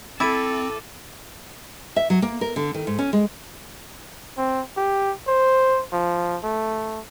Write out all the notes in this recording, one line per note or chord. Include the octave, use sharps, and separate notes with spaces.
C4 E4 A4 D6 A6 D#7
E5
F#3
A#3
A#4
D3
D#3
G#2
C#4
G#3
C4
G4
C5
F3
A3